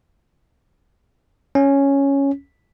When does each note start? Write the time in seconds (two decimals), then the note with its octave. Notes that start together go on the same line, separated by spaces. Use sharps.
1.55 C#4